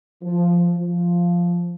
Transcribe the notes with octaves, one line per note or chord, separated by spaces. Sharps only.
F3
F3